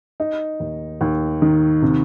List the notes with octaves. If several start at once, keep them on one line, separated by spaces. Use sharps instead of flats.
D#4
D#2
D#2
D#3
C3